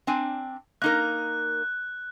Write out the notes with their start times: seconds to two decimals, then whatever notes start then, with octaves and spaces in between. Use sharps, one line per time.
0.07 C4 D4 G#5
0.82 A#3 D#4 A#4 F#6